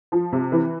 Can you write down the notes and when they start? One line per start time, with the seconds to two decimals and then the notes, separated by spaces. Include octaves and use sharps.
0.12 F3
0.33 C3
0.52 E3